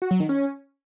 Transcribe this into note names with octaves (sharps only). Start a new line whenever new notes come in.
F#4
F#3
D#3
C#4